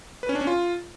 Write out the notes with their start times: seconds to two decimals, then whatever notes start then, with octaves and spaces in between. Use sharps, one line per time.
0.23 B4
0.29 C#4
0.35 D4
0.41 C#4
0.47 F4